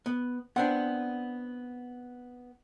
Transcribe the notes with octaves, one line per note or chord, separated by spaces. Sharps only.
B3
B3 C4 D4 F#5